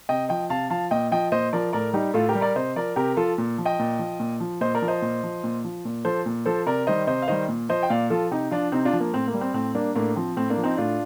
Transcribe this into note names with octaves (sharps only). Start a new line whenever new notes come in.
C3 D#5 G5
F3 D#5 G5
C3 F5 A5
F3 F5 A5
A#2 D#5 G5
F3 D#5 G5
A#2 C5 D#5
F3 A#4 D5
A2 A#4 D5
G3 D#4 G4
A2 F4 A4
G4 A#4
G3
A#4 D5
C3 C5 D#5
F3 A#4 D5
C3 G4 A#4
F3 F4 A4
A#2
F3
D#5 G5
A#2
F3
A#2
F3
A#2 C5 D#5
A#4 D5
F3
C5 D#5
A#2
F3
A#2
F3
A#2
F3 A4 C5
A#2
F3 A4 C5
C3 A#4 D5
D#3 G3 C5 D#5
C3 C5 D#5
F5
D#3 G3 C5 D#5
A#2
F3 C5 D#5
G5
A#2 D5 F5
F3 F4 A4
C3 D#4 G4
F3 D4 F4
C3 C4 D#4
D4 F4
F3
A#3
A2 C4
A#3
G3
C4
A2 C4
G3 A#3 D4
A2 A#3 D4
F3 C4
A2 C4
A#3 D4
F3
C4 D#4
A2 D4 F4